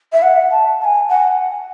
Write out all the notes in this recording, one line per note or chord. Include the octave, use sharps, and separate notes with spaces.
E5
F#5
A5
A5
G#5
F#5